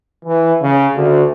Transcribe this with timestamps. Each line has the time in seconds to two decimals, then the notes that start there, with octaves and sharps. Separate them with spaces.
0.25 E3
0.62 C#3
0.96 D2